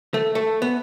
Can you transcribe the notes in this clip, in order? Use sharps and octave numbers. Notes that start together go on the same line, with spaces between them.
A3
A3
B3